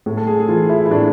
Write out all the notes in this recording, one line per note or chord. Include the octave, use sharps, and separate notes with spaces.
A2
A4
G#4
G#4
E3 F4
E4
E4
A2 D4